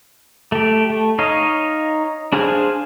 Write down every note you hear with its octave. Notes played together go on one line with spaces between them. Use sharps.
A3 G4
A3
D#4 C#5 D#5 F5
D4 G#4 C5 F5 G#5